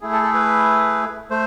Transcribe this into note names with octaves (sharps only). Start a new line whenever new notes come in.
A3 E4 G#4
A4
A4
B4
A3 C5